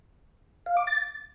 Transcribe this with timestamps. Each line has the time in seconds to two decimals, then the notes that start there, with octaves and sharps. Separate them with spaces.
0.66 F5
0.77 D6
0.87 A6